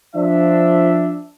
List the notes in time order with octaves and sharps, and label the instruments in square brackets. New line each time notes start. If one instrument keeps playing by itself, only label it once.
[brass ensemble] F3 D4 E5